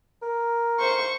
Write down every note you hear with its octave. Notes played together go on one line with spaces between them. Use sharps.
A#4
C5 C#6